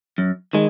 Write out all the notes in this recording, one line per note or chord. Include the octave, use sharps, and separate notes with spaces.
F#2
D#3 G#3